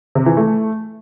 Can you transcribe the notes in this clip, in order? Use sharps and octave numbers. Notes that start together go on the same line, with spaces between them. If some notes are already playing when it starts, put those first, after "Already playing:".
C3
E3
A3